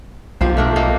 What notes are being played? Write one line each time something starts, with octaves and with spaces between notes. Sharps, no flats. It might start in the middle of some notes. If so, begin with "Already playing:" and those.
B1 F3 G4 C5
A3 D4 A#4
A#3 D#4 A4